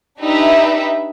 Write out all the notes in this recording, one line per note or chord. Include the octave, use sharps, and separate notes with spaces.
D4 D#4 G4 B4 E5